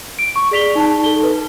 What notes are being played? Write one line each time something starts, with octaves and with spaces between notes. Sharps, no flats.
D7
C#6
G#4 D5 B6 F7 G7
D#4 A5
A4 G7
B4